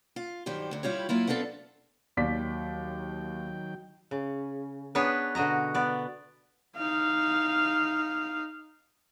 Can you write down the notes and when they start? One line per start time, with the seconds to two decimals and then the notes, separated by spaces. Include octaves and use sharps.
0.16 F4
0.46 G2 D#3 F#3 G4 C5
0.71 D2 D3
0.83 G3 E4 F4 G4 C#5
1.09 F#3 A#3 E4 F4
1.27 B3 C4 D4 F4 A4
2.17 D#2 D#3 F#3 D5 G5 B6
4.11 C#3
4.95 B3 D4 G#4 B4 C#5
5.35 B2 D3 F#4 D#5 A#5
5.74 B3 D5
6.77 D#4 F5